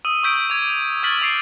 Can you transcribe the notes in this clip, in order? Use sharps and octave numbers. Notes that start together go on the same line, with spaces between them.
D#6 E6 D#7
C#6 E6 G6 B6 D7
D6 G#6
C#6 F6 G#6 A6 B6 F#7
D6 A6 C7 D7